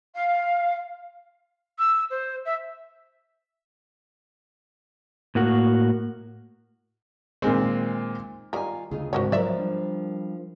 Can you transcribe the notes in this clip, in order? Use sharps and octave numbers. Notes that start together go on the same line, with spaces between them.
F5
E6
C5
E5
A2 A#3 F#4
A#2 D#3 G#3 C4
D#3 G3 F4 A#4 G#5
D2 C#3 D#4 F4 G#4
G#2 C3 F#4 A#4 C#5
F3 F#3 A#4 D5 E5
G3 D4